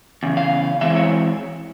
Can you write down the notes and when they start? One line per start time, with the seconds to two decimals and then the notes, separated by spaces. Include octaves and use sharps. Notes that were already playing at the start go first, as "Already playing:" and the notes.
0.23 E2 C#3
0.37 F5
0.81 E3 G#3 C4 E4 E5
0.96 C#5